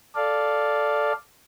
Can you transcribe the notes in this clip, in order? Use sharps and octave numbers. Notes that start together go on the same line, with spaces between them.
A4 D5 F5